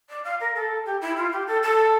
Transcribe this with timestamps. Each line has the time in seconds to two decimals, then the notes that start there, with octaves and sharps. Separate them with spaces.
0.09 D5
0.24 F5
0.40 A#4
0.55 A4
0.85 G4
1.01 E4
1.17 F4
1.32 G4
1.47 A4
1.63 A4